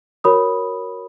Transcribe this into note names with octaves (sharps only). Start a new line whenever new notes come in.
F#4 A#4 C#5 B5 D#6